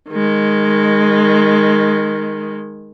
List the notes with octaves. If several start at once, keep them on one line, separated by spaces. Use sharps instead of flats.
D#3 G#3